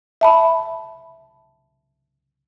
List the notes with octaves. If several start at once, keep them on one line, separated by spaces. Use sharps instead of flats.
E5 A5 B5